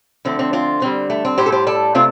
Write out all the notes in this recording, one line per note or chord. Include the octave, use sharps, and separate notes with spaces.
D3 F3 A3 C4
C4
C4 F4
D3 G3 C4
A3
C4
A2 G3 G4 C5
A4
G4 C5
A4 D5
C3 A3 C4 F4